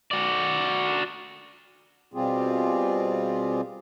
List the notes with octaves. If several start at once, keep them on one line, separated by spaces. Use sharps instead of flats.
F#4 D5
B2 G3 C4 F4 G4 G#4